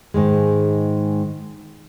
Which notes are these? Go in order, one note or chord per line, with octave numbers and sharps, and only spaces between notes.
G#2 D#3 G#3